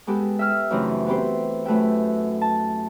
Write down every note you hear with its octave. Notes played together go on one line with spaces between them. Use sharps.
G#3 B3 G4 A4
E5 G5 E6 F6
F#2 C#3 E3 A3 C4 D#4
B3 C4 E4 G4 C5
F#2 A3 B4 E5 G5
A5